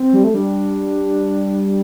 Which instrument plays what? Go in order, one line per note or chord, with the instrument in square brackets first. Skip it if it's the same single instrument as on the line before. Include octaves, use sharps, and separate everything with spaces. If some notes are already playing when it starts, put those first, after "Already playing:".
Already playing: [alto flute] C4
[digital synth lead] G3
A3
[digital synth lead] G3 [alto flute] D4